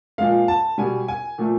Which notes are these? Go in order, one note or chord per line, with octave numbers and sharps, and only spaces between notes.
A#2 F3 G#3 F5
A5
B2 G3 G#5
G#5
A#2 F3 A3